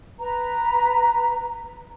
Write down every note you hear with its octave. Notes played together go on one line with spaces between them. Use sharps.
B4 A#5